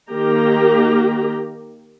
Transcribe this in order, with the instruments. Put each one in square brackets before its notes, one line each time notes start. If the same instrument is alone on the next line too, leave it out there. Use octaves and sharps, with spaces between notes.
[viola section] D#3 A#3 G4 A#5